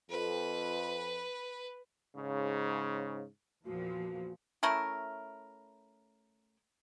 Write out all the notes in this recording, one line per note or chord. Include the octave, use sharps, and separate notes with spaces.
F2 B4
G#2 C#3
E2 A#2 F3 F#4
A3 C#4 E4 A#4